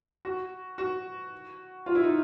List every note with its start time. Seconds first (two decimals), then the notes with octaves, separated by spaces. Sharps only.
0.25 F#4
0.78 F#4
1.86 F4
1.95 E4
2.03 D#4